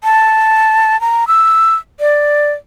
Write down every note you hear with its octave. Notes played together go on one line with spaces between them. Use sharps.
A5
A#5
E6
D5